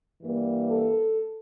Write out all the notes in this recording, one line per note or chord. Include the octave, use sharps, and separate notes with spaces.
G2 E3 G3 A#3
A4